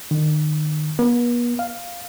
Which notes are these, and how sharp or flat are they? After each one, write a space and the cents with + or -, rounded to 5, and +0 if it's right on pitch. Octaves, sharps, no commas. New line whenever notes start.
D#3 -35
B3 -45
F5 +5